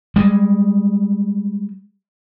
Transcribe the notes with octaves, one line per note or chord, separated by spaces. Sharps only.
G3 G#3